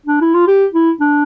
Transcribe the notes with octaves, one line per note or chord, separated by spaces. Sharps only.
D4
E4
F4
G4
E4
D4